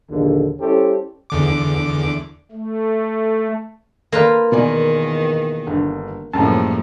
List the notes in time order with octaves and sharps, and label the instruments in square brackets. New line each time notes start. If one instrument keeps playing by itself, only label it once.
[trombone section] A#1 D#2 D3
G3 C#4 E4 G4 A4 C5
[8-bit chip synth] E2 D3 D6
[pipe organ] A3
[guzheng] A#3 F4 B4
[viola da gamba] E2 D#3 [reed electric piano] B2 [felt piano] A#4 D5 G#5
[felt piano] G1 D3
[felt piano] F#2 C#3 G3 [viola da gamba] A2 F3 A#3 [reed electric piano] A5